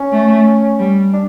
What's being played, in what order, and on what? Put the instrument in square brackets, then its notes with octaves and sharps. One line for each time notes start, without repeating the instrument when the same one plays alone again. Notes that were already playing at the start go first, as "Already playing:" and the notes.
Already playing: [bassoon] C#4
[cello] A3
G3
[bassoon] D4